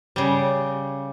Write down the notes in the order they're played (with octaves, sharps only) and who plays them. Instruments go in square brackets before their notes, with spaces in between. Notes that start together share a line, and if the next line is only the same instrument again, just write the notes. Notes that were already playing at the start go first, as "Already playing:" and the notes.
[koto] C#3 G3